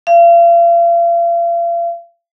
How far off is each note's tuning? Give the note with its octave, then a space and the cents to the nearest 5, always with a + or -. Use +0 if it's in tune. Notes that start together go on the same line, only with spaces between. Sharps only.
F5 -40